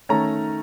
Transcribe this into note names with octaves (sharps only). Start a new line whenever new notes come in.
D#3 A3 C#4 A#5